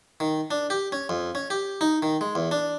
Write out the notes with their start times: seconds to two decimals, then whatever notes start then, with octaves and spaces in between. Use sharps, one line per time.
0.20 D#3
0.51 D4
0.70 G4
0.92 C#4
1.09 F2
1.35 C#4
1.50 G4
1.81 D#4
2.02 D#3
2.21 G#3
2.35 E2
2.51 D4